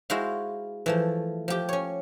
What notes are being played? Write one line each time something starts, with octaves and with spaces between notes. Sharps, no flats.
G#3 E4 F#4 C5 F5
E3 F3 A3
F3 G4
C#4 C#5